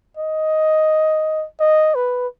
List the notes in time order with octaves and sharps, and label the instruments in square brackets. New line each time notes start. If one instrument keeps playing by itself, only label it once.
[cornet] D#5
D#5
B4